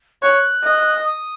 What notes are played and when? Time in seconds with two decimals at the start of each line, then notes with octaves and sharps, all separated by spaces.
0.22 C#5 F#6
0.63 D#5
1.05 D#6